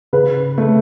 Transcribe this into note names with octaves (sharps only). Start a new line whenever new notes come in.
C#3 B4
A3